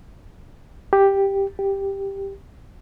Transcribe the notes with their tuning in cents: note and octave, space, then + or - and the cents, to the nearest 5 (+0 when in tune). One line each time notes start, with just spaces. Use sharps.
G4 +5
G4 +5